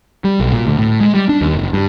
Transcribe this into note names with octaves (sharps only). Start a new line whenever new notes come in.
G3
B1
A#2
D2
A2
G#3
G3
D4
D#2
F#1
G2